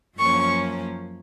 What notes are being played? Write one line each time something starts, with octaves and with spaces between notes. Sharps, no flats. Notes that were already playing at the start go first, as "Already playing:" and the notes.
F#2 F3 A#3 C#4 C#6